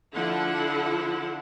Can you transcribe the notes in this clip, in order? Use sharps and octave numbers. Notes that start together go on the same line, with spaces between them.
D3 F3 E4 F#5